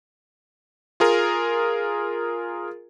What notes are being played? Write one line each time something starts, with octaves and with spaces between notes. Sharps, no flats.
F4 G#4 A#4